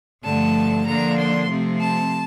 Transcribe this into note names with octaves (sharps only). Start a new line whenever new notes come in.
G2 D3 F3 A3 A5
D3 F3 A#3 D4 A#5
C6
C3 F3 A3 C4
A5